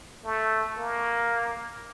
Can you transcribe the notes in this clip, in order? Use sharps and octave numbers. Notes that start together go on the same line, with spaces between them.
A3
A#3